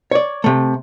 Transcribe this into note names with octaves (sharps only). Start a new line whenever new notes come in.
C#5 D5
C3 A3